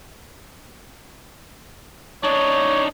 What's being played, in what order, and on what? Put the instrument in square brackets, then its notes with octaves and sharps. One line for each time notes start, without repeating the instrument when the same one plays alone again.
[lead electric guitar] D4 D#4 [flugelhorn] C#5